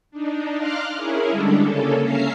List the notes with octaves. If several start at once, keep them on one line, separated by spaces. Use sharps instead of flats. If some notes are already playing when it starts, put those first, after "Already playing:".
D4 D#4
F5 A#5 C6 D6 F6 F#6
C#4 E4 G#4 A#4
D3 G3 G#3 D4 A4
C#3 A#3 C#4 A4
C#4 E5 F5 A#5 C7